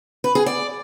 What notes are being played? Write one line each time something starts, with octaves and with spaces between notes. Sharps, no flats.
B4
G#4
D5